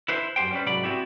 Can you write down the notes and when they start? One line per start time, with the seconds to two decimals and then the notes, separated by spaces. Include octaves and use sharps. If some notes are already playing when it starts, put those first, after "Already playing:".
0.08 E4 B4 C5
0.36 F#2 G4 C5 G5
0.51 G3 C#4 B4
0.65 C2 G#2 F#3 D5 B5
0.83 B3 C4 E4 F#4 G4